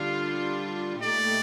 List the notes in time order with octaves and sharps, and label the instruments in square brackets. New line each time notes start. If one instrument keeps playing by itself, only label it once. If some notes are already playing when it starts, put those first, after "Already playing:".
Already playing: [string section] D3 G3 D4 F4 [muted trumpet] F5
[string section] A#2 A3 D#4 G4 [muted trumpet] D5